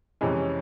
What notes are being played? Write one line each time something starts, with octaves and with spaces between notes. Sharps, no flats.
F2 C3 E3 G#3 C#4